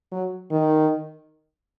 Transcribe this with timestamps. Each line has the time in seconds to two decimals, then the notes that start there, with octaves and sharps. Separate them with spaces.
0.12 F#3
0.51 D#3